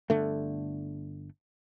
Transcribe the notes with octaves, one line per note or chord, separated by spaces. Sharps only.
G1 D3 A3